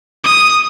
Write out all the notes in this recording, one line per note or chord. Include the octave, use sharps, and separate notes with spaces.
D#6